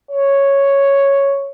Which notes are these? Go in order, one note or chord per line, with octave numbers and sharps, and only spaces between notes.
C#5